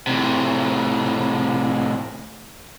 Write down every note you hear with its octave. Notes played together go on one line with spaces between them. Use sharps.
A2 C3